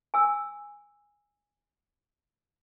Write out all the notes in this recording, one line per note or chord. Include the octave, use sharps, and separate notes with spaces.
G#5 E6